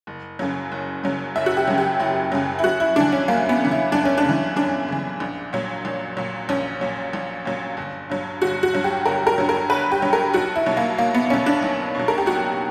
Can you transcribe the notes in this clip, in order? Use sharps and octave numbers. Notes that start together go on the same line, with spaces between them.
F#1
F#2 C#3 F#3
F#1
F#2 C#3 F#3
F#1 E5
F#4
G4
F#2 C#3 F#3
G4
F#1 E4
F#2 C#3 F#3
E4
F#2 F#4
E4
C#3 E3 D4
C#4
F#2 A#3
B3
C#3 E3
E4
F#2 D4
C#4
D4
C#3 E3
F#2 D4
C#3 E3
A#1
A#2 F#3
A#1
A#2 F#3
A#1 C#4
A#2 F#3
A#1
A#2 F#3
G1
G2 F#3
G1 F#4
F#4
G2 F#3
G4
G1 A#4
A#4
G2 F#3
A#4
G1 B4
G4
G2 F#3
A#4
B1 F#4
E4
B2 F#3
A#3
B1 A#3
B3
B2 F#3 C#4
D4
B1
B2 F#3
A#4
G4
B1 F#4